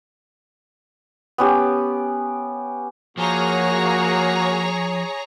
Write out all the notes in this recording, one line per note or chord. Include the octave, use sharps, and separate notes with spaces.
B3 C#4 G4
F3 A#3 F#4 G#4 C#5 A#5